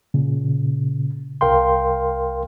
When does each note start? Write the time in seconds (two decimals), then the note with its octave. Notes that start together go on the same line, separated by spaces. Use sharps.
0.14 A#2 C#3
1.41 C2 A#4 F5 G5 C6